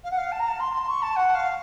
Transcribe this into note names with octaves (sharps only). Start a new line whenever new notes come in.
F5
F#5
F5
A5
A#5
A5
C6
C6
C#6
A5
F#5
F5